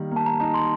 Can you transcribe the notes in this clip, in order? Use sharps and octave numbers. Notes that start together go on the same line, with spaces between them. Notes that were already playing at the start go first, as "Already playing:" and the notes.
Already playing: D#3 G3 A#3 D#4
A#3 A5
A#5
D#4 A#5
C6